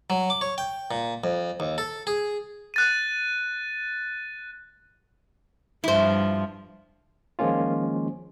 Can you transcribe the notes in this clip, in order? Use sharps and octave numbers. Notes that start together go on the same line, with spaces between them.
F#3
D6
C#5
G5
A#2
F2
D#2
A4
G#4
F#6 A6 D#7
G2 F3 E4 C5
D#3 F3 G#3 A#3 C#4 F4